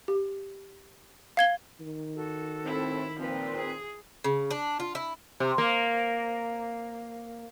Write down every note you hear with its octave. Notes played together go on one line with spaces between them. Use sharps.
G4
F5 G#6 G7
D#3
F#4 A4
A2 C4 E4
A#2 F3 C4 B4
G#4
C#3
D4
F4
E4
C3
A#3